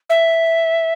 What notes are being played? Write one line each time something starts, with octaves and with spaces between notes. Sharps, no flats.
E5